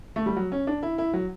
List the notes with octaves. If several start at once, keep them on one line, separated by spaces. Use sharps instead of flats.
A3
G3
F#3
C#4
D4
E4
E4
F#3